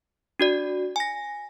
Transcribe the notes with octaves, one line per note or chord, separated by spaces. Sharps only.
D4 F#4 D5
G#5 A#6